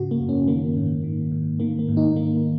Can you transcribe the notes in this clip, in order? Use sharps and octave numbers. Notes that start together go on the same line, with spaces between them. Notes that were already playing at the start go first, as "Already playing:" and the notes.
Already playing: G#2 C#3 F#4
A#3
F#2
C#4
D#3 A#3
G#2
D#3
G#2
D#3 A#3
A#3
G#2
D#4
D#3 A#3